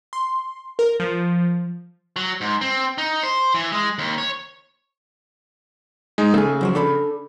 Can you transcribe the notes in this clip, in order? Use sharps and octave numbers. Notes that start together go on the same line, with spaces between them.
C6
A#4
F3
F#3
G#2
C4
D#4
C5
E3
G#3
D#2
C#5
G#3 D#4
C#3 A3 G#4
F#2 F3 F#3
D4 A4 B5